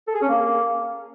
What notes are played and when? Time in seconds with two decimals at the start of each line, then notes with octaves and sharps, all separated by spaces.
0.08 A4
0.15 G#4
0.22 C#4
0.29 A#3